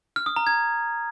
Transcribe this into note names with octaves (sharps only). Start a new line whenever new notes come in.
F6
D#6
A#5
G#6